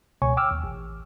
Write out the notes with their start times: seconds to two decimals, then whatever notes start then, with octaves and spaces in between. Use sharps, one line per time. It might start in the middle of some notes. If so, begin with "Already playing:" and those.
0.22 C#2 B2 C#5 G#5 C#6
0.37 G5 D6 E6 F6
0.51 D#2
0.64 A1